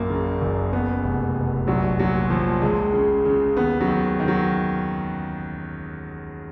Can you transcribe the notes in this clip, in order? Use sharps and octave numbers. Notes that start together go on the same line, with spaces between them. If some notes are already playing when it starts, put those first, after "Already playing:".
Already playing: A#1 F#2 A#3
C#3
F#1
C#3 B3
F1
F1
A#1 F#3
A#2 F#3
A#2 F3
C#2 G#3
C#3
C#3
D#2 B3
F#3
D#3
D#3
F#3